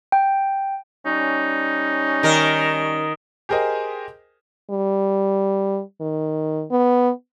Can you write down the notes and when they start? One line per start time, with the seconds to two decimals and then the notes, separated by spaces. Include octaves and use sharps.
0.12 G5
1.06 G3 C#4 D#4
2.23 D#3 A#4
3.49 G4 G#4 A#4 C5 D#5 G#5
4.70 G3
6.01 D#3
6.71 B3